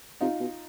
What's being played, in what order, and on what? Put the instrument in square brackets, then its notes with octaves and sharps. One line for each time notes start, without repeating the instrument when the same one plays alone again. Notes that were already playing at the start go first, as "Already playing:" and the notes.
[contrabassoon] C3 [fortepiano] D#4 F4
[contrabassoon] B2